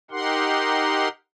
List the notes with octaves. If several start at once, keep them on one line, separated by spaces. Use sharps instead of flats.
D#4 G4 A#4 F#5 C6